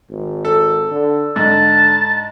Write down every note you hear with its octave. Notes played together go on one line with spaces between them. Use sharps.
G#1
A4
D3
G#2 D3 A5